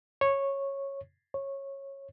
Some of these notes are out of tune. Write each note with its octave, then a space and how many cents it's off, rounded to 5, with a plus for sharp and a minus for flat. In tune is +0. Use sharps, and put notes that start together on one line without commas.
C#5 -10
C#5 -15